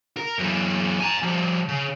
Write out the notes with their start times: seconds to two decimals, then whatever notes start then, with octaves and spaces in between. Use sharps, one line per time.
0.17 A#4
0.39 F#2 E3
1.00 G#5 A#5
1.23 F3 G3
1.68 C#3